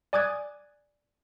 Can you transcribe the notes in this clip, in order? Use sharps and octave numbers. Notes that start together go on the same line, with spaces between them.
D5 G#5 D6 D#6 F#6 G#6